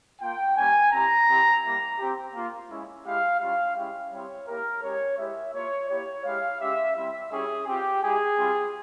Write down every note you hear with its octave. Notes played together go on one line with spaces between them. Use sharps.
A#3 F4 G5
G3 A#3 C#4 G#5
C4 E4 G4 A#5
C4 E4 G4
G3 A#3 E4
C4 G4
A#3 F4
G#3 C#4 E4
G#3 E4 G4 F5
G3 C#4 F4 F5
G#3 C#4 E4 G4
G3 C4 E4 G4 C#5
A#3 E4 G4 A#4
G#3 C#4 G4 C#5
G#3 E4 G4 E5
A#3 F4 C#5
A#3 E4 G4 C#5
G#3 E4 G4 F5
G#3 C#4 G4 E5
G3 C4 E4 E5
G3 C#4 E4 G4 G#4
C4 F4 G4
G#3 E4 G4 G#4
G3 C4 F4